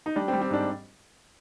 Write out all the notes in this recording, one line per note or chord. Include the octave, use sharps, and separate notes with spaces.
D#4
G3 D4
C4
G3
C4
G#2 D4